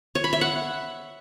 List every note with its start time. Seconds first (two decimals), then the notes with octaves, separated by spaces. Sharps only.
0.15 C#5
0.24 B5
0.33 E5
0.41 F#5